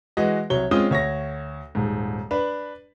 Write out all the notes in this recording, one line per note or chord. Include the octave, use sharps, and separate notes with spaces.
E3 G#3 F#4 D#5
C2 F#3 C#5 G7
G#3 C4 C#4 F4 D#6 G7
D2 C#5 C#6 A#6
D#1 G#2
D4 B4